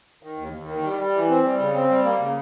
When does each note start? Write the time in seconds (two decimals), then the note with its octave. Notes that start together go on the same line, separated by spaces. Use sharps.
0.23 D#3
0.38 D#2
0.53 D#2
0.68 D#3
0.83 G3
0.99 G3
1.14 E3
1.29 C4
1.44 G3
1.59 C#3
1.75 C4
1.89 G3
2.04 A#3
2.20 C#3